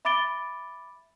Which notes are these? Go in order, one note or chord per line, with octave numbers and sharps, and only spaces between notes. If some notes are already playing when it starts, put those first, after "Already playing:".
E5 B5 D6 A6 D7 G7